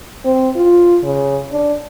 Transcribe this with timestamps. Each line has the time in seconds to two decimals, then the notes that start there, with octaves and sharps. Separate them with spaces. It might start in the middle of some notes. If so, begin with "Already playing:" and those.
0.25 C4
0.56 F4
1.04 C#3
1.52 D4